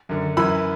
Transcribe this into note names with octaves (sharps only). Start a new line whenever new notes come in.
F#2 D3
F#2 E3 B5 E6